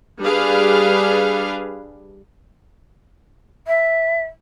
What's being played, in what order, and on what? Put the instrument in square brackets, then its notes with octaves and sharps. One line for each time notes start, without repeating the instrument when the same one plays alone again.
[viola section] G3 D4 G#4 B4 F5
[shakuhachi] E5